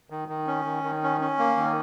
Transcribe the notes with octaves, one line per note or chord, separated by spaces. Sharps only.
D#3
D#3
C#4
D#3
D#3
C#4
C#4
A#3
D#3